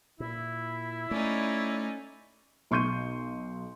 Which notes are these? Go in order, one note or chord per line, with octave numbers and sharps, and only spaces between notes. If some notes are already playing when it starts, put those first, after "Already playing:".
A#2 E4
A3 C#4 D#4 D5
B1 C6 C#6 G6 D#7